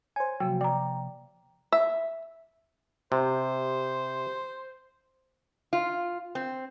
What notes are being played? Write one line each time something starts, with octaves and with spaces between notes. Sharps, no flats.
C5 C#5 G#5
C3 F3 F#3 A#3 G5
D5 G5 A#5
E5
C3 C5
F4
C4